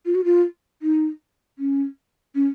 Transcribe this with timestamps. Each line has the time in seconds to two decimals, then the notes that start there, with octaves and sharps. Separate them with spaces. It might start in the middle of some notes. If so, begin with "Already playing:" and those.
0.06 F4
0.15 F#4
0.24 F4
0.82 D#4
1.59 C#4
2.35 C#4